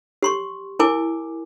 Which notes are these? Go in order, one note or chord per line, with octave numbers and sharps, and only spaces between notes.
G4 C6 C#6
E4 A#4 G#5 D6